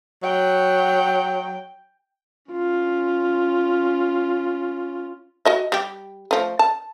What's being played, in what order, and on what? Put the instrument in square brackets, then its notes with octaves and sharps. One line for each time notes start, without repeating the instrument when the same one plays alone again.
[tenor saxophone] F#3 [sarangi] G5
[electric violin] C#4 F4
[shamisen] F#4 D#5 E5
G3 G4
F3 A3
A5